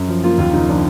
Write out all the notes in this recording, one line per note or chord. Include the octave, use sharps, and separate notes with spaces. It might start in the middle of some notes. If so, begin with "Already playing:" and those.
Already playing: F#2
F3
A#3 F4
D#2 F4
C#3 D#4
F3 D4